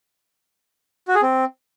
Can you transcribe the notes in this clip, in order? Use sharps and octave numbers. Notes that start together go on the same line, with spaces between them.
F#4
G#4
C4